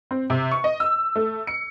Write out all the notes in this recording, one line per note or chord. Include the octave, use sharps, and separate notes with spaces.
C4
C3
C#6
D#5
E6
A3
C#7